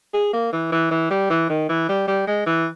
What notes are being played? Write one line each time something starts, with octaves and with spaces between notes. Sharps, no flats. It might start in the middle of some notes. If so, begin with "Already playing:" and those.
G#4
A#3
E3
E3
E3
G3
E3
D#3
E3
G3
G3
G#3
E3